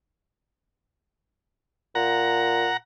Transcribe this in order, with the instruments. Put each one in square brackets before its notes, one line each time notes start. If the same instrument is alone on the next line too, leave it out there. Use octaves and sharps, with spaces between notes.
[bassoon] A#2 [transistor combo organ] F#5 A#5